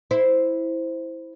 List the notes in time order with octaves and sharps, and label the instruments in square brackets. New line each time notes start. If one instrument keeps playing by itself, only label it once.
[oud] E4 C5